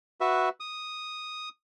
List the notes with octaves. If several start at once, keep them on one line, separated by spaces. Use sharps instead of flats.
F#4 B4 E5
D#6